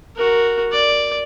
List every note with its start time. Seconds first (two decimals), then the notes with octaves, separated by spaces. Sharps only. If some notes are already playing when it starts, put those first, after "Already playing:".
0.16 F#4 A#4
0.72 D5